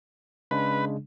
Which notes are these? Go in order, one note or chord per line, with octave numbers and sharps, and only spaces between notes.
C#3 G#3 D4 B4